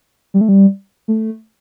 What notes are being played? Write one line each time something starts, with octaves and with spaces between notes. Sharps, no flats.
G3
A3
G3
A3